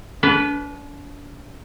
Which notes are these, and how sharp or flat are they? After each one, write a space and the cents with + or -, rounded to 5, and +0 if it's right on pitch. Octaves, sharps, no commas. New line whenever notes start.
D4 -40 B4 +0